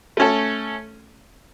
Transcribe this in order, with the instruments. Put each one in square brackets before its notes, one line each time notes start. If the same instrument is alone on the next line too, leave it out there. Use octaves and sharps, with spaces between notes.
[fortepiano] A3 C#4 A4